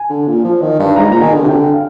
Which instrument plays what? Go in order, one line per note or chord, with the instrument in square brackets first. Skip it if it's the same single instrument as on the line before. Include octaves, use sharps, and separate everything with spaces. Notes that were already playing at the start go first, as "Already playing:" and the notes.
Already playing: [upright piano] G#5
[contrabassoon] D3
A#2
F3
D#3
G2
[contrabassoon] G#2 [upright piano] A#5
[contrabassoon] A#2 [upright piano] A#5
[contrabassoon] D#3 [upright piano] G#5
[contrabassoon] D3
C3
[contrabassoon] D3 [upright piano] G5
[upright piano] F5